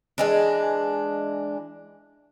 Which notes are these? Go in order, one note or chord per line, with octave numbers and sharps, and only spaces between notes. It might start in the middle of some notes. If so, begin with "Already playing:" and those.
E3 G#3 D4